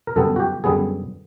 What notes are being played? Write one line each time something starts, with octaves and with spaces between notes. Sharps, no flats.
A#4
F#2 D3 G3 B3 A4
F#4
G4
F#2 D3 G3 B3 G#4